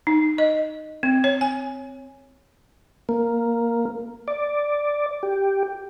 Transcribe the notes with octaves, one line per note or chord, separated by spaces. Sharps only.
D#4
D#5
C4
C#5
G#5
A#3
D5
G4